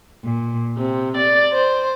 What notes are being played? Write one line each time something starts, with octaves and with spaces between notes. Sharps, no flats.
A#2
C3
D5
C5